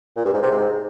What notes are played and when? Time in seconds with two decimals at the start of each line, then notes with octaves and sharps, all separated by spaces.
0.16 A#2
0.25 G2
0.34 G#2
0.42 C3
0.51 G#2